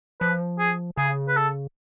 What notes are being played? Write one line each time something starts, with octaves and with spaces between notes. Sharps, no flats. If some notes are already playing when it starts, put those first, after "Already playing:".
F3 B4
G#4
C#3 G#4
B4
A4